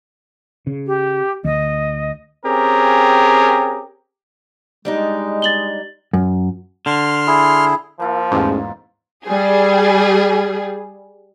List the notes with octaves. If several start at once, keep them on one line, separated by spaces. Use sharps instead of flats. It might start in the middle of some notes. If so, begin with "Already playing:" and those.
C#3
G4
D2 D#5
C4 C#4 G4 G#4 A#4
G3 G#3 D4 D#4
A6 F#7 G7
F#2
D3 C6 F6
E4 G#4
F3 A#3 E4 F4
A1 E2 G#2
G3 G#4